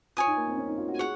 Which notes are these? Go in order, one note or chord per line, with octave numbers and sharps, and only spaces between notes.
F4 C#5 G#5 D#6
D#4
A#3
C4
C#4
D#4
F4
F#4
G#4 C#5 F#5